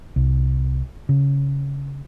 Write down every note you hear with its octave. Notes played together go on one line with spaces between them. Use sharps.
C2
C#3